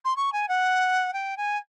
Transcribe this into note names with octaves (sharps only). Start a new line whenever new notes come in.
C6
C#6
G#5
F#5
G5
G#5